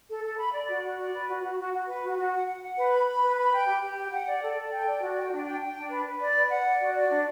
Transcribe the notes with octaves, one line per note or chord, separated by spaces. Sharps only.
A4
A4
B5
D5
F#4
F#4
D5
B4
F#4
F#4
F#4
F#4
B4
F#4
F#4
F#5
F#5
F#5
B4
B5
B5
B4
B5
G5
G4
G4
G5
F#5
D5
A4
A4
G5
D5
F#4
G5
D4
G5
G5
D4
B4
B4
D5
B4
F#5
D5
F#4
D5
D4